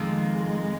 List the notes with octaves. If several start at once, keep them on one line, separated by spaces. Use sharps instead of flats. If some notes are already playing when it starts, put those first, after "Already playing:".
Already playing: F2 D#3 G#3 A#3 F4